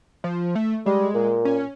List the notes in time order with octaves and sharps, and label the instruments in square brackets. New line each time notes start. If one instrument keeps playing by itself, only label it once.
[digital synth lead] F3
A3
[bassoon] G3 [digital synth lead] G#3
[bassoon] A#2
[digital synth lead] C#4